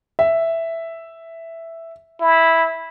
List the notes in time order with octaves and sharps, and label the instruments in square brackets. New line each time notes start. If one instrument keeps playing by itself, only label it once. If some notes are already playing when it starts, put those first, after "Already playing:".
[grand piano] E5
[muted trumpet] E4